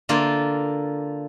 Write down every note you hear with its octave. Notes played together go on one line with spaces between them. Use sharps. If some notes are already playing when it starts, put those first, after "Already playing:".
D3 A#3 F4